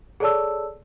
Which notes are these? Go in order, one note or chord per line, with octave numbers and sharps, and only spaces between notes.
G#4 A4 C#5 D5 A5 E6